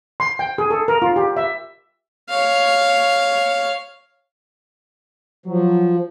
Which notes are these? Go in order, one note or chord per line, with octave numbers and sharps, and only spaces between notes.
C6
G5
G#4
A4
A#4
F4
G4
E5
C#5 F5
F3 F#3